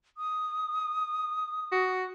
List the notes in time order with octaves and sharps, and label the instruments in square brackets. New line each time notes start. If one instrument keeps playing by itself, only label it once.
[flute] D#6
[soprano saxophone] F#4